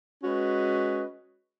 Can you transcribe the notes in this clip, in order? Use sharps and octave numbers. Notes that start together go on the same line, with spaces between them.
G#3 C#4 F#4 B4 D#5